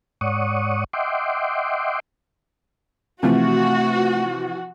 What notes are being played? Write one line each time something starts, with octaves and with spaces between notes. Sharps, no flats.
G#2 C#5 D5 F#5 C#6 D#6
D#5 E5 F#5 G5 C6 D6
C3 E3 F3 A3 F#4